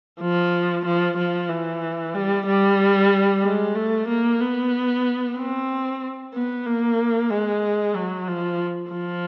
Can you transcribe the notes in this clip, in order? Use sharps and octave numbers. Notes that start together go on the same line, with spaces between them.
F3
F3
F3
E3
G3
G3
G#3
A3
A#3
B3
C4
B3
A#3
G#3
F#3
F3
F3